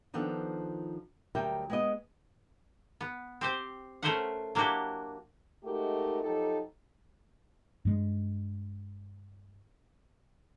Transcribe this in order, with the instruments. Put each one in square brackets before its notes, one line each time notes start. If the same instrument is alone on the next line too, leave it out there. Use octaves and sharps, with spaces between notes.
[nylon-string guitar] D#3 F3 B3 D4 A4
D2 F#3 G3 A#4 E5 G5
G#3 B3 D#5
[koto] B3
C4 G4 C5
A3 C#4 A#4 C5 E5 F#5
F#3 A#3 D4 E4 F#4 G4
[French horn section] G#3 A3 D#4 F#4 G4 A#4
F3 F#3 D#4 G4 A4
[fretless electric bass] G2 G#3